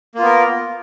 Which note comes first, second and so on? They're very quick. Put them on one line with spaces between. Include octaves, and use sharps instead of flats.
A#3 F4 B3 A#4